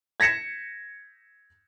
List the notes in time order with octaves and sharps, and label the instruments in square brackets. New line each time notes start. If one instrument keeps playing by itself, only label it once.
[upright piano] G#6 A#6 B6 C#7 E7